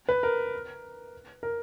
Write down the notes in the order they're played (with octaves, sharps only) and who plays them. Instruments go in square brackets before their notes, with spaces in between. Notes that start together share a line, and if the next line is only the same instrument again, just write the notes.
[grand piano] B4
A#4
A#4